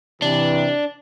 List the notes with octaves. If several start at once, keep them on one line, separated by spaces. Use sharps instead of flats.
C3 E3 D4